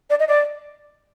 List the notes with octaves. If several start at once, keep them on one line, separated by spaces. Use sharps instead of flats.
D5
D#5
D5